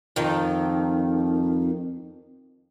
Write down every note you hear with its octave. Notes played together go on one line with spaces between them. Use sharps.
F2 D#3